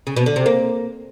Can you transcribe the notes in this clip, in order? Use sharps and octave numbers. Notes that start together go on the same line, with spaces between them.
C#3
B2
D3
C3
A#3